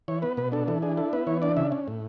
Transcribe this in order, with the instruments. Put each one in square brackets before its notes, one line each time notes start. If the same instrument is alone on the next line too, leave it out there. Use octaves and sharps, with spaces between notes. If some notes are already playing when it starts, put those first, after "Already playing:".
[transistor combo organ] E3 C#5
B3 B4
B2 B4
D4 A4
E3 A4
D4 G#4
E4 A4
B3 B4
E3 C#5
D4 D5
C#3 E5
C#4
A2